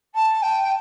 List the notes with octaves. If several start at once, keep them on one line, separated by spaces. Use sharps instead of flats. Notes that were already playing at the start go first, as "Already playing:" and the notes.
A5
G5